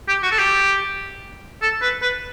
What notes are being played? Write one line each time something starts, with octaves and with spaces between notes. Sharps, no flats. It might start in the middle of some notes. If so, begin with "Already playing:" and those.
G4
F#4
A4
G4
A4
B4
B4